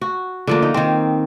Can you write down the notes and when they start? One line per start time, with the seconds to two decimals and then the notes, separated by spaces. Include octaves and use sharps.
0.01 F#4
0.47 D3 F3 A#3
0.62 D#4
0.74 D#3 C4